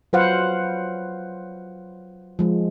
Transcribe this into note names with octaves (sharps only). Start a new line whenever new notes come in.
F#3 F4 B4 C5 F5 F#5
F3 G#3